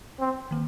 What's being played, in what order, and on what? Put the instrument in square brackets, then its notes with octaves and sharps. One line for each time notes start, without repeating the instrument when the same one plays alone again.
[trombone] C4
[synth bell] D#3 A#3